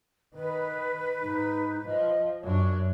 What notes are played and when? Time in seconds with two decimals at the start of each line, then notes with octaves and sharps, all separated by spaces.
0.34 D#3 B4
1.21 G#2 D#4
1.86 F3 D#5
2.43 F#2 D4 C#5